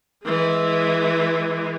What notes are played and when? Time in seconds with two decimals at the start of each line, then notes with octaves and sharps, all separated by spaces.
0.24 E3 G#3